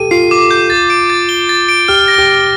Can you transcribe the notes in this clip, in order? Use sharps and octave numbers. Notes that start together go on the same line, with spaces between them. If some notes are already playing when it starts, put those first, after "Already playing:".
Already playing: G4 A4 D#7
F4 C7
D6
G6
A6
D7
A6
G7
A6
D7
G4 F6
A#6
G4
F6